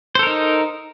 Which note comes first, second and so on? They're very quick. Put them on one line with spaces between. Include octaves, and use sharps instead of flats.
C5 A4 A#4 D#4